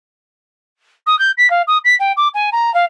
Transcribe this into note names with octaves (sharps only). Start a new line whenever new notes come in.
D#6
G6
B6
F5
D#6
B6
G5
D6
G#5
A#5
F5